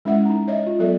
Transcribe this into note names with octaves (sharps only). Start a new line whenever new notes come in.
G#3 C#4 E4 E5 F#5
D#4 A#5
C#5 D#5 E5
F4
F#3 B3 A4 E5